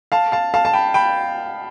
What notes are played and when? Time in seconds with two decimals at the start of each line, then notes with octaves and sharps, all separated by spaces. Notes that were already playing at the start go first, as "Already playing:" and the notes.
0.12 F5 A5
0.32 F5 A5
0.54 F5 A5
0.65 A5
0.73 G5 B5
0.94 G5 B5